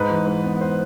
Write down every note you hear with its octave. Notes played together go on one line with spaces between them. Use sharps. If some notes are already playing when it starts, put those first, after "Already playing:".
Already playing: G#2 B4
E3
G#2
B3
C5